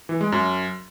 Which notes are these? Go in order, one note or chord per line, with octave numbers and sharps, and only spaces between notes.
E3
G#3
F#2